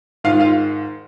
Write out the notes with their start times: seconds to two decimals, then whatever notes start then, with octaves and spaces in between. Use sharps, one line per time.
0.24 G#2 D#3 F4 F5
0.40 F4 F5